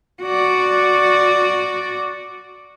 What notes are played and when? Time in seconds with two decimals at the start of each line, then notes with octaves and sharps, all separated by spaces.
0.22 F#4 D5